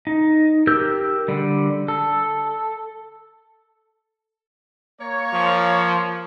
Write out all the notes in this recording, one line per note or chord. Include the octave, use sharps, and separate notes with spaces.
D#4
G4 A#4 E6 G6
D3 G3
A4
A#3 C#5
F3